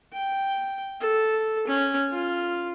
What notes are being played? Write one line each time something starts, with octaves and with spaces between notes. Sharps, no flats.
G5
A4
C#4
F4